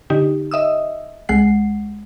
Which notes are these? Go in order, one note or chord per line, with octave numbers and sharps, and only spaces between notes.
D3 D#4 G4
D#5 E5 D#6 E6
C2 G#3 F#5 C7